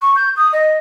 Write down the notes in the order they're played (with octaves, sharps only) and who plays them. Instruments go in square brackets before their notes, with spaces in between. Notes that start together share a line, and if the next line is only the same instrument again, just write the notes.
[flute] C#6
G6
D#6
D#5